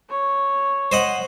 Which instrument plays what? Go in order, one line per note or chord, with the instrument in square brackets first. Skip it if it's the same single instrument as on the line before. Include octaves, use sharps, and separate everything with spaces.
[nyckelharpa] C#5
[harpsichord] C5 D#5 F#5